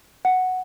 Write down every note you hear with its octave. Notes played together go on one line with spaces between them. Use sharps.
F#5